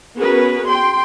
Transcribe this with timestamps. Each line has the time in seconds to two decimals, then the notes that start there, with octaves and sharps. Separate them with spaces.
0.17 B3 C#4 F#4 G#4 A#4 B4
0.67 G5 C6